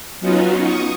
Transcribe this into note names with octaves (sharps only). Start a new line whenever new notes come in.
F#3 B3 C#4 D#4 F4 F#4
C#6 D#6